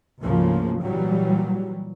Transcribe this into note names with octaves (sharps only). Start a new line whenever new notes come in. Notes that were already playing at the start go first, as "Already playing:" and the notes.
D2 G#2 C#3 F3 A#3
A#2 E3 F#3 G3